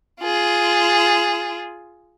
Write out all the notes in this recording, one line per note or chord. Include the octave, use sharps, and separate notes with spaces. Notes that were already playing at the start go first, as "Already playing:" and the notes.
F4 G#4